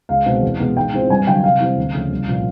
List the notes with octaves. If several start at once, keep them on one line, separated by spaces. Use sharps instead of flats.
C#2 F5
B2 G#3 C4
E2
B2 G#3 B3
G#2 G5
E3 G#3 C4 F4
G2 G#5
D3 F#3 G5
C3 F5
E3 G3 C4
D2
C#3 F3 A3 C#4
C2
A#2 F3